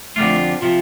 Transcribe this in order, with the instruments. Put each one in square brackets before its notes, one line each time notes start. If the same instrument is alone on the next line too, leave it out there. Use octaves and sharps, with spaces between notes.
[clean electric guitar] F2 D3 G3 D4 F4 [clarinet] A3
[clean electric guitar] C3 F3 [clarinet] F4